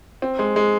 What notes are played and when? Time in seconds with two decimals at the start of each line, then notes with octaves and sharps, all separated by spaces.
0.22 C4
0.39 G#3
0.56 G#3